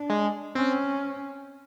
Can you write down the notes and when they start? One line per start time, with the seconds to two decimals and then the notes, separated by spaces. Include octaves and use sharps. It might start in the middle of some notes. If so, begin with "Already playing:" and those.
Already playing: D4
0.10 G#3
0.55 C4 C#4